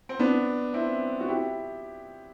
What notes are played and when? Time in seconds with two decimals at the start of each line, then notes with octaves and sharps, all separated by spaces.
0.09 C4
0.19 B3 D4
0.74 C4 E4
1.20 F#4
1.28 E4 G4